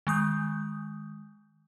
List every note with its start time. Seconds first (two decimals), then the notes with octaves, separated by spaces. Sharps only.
0.07 D#3 G#3 D#6 G6